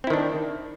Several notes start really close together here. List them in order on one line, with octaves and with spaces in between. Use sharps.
C4 E4 D#3 D4